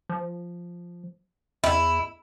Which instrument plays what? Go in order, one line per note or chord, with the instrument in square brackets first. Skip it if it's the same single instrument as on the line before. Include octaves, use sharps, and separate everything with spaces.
[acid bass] F3
[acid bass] E2 [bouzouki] E4